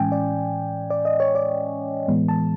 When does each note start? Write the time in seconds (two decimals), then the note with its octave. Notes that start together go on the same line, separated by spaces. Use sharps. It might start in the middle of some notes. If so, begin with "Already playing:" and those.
Already playing: A2 E3 G#3 C#4 G5 G#5
0.12 D5
0.90 D5
1.05 D#5
1.20 C#5
1.35 D5
2.08 A2 E3 G#3 B3
2.28 A5